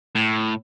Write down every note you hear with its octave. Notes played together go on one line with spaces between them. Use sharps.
A2